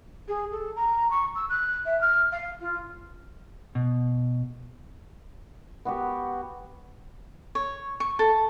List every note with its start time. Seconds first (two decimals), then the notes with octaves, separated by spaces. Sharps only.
0.28 G#4
0.52 A4
0.76 A#5
1.10 C#6
1.35 E6
1.49 F#6
1.85 E5
2.01 F6
2.32 F5
2.61 F4
3.75 B2
5.85 B3 F#4 G4
7.55 C#5
8.00 C#6
8.19 A4